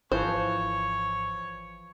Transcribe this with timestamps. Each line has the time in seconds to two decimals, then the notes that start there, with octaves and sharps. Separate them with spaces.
0.12 G#1 E3 F3 C5 C#5